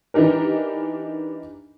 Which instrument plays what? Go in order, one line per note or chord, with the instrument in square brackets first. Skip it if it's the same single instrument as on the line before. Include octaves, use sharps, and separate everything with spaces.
[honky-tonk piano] E3 D4 D#4 G4 A#4